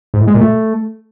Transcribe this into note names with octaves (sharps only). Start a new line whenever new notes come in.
G#2
A2
G#3
A#2
A3